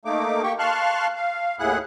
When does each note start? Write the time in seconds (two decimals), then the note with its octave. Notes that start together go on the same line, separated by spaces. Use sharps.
0.05 A3 A#3 D#4 D6
0.43 A#3 G4 G5 C#6
0.59 F5 A5 C6 C#6 F6 F#6
1.16 F5
1.59 D#2 A2 E4 G#4 F#5 F#6